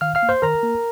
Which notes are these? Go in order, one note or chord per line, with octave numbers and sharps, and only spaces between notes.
D#3 F5 F6
F5 F6
A#3
C5 C6
D#3 A#4 A#5
A#3